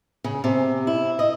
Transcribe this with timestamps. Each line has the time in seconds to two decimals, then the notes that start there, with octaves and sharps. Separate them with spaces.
0.24 C#3
0.44 C3
0.87 E4
1.19 D#5